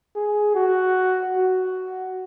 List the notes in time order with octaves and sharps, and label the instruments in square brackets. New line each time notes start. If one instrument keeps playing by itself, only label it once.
[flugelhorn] G#4
F#4
F#4